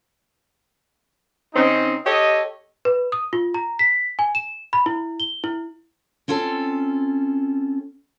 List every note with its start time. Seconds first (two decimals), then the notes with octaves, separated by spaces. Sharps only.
1.55 C#3 C4 C#4 D#4
2.06 G4 A4 C#5 D#5
2.85 B4
3.12 D#6
3.33 F4
3.54 A#5
3.79 B6
4.19 G#5
4.35 E7
4.73 B5
4.86 E4
5.20 G7
5.44 E4
6.28 C4 C#4 F4 A4